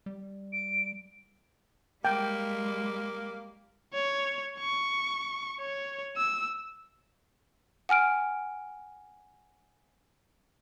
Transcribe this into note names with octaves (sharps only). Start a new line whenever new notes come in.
G3
D7
G3 G#3 A#3 G5
C#5
C#6
C#5
E6
F#5 G#5 F6 D7